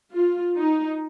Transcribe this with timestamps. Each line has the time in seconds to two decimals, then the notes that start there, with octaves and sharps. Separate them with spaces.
0.13 F4
0.56 D#4